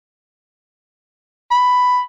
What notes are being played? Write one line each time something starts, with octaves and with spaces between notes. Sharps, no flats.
B5